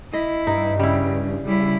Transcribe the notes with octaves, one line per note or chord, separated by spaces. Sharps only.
E4 D#5
G2 D#4
C#3 G3 E4
C#3 G3 E4